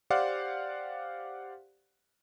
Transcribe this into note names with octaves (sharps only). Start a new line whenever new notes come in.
G4 C5 D5 F5 F#5